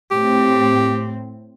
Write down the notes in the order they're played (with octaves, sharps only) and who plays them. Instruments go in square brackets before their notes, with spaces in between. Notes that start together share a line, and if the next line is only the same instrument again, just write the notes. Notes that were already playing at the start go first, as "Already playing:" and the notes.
[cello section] A2 C4 [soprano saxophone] G4